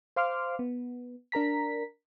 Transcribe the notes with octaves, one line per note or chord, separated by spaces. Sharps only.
C5 F5 C6 D6 F6
B3
D4 A#4 A#5 B6